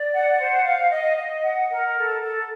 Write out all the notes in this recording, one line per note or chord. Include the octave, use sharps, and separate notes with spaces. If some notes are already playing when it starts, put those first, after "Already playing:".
Already playing: D5
F#5
C5
F5
D#5
D#5
F#5
A#4
A4
A4